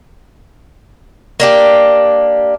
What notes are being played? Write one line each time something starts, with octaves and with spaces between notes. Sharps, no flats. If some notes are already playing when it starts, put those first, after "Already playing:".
A#3 D4 G4